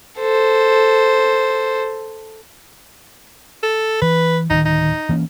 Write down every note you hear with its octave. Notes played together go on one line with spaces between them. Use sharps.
A4 C5
A4
E3 B4
D1 D#3 D#4
D#4
E3 A#3 C#4